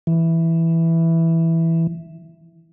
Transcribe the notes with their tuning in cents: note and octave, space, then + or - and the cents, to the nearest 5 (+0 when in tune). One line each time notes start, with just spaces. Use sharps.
E3 +0